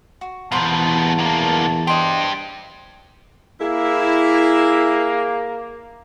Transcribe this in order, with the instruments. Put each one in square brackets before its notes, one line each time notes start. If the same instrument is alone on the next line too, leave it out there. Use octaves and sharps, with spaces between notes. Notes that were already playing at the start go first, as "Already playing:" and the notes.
[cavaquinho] F#4
[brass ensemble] E2 E3 A5 [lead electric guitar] B2 G3 [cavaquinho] F4 A#4 C5
[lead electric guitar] B2 A#3
[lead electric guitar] D4 G4 [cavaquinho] C5 D#5 D#6
[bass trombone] A#3 [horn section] E4 [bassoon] G#4